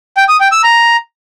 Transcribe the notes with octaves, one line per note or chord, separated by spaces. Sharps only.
G5
D#6
G5
E6
A#5